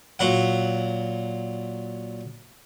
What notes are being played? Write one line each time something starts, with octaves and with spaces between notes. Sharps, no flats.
A#2 F#3 F#5